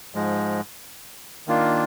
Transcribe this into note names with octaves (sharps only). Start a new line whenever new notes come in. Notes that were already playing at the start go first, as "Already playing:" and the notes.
G#2 F3 G#3
D#3 A#3 D4 F4